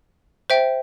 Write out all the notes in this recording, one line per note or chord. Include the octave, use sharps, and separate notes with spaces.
C5 E5 G5